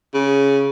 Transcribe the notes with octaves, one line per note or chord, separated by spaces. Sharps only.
C#3